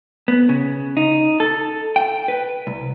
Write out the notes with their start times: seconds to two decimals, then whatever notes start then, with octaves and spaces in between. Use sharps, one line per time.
0.28 B3
0.49 C#3
0.97 D#4
1.40 A4
1.96 G5
2.28 B4
2.67 C2